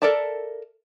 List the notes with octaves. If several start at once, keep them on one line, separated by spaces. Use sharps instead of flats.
A4 A#4 D5 E5 A5